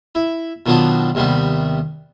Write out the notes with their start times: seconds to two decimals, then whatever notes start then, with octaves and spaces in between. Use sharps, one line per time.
0.15 E4
0.66 B2 D#3 F3 F#3 B3 D4
1.15 D#2 C3 D#3 G3 B3